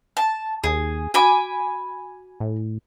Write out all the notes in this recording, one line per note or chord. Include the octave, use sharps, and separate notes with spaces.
A5
D#2 G#4
F#4 G#5 B5 D6
A2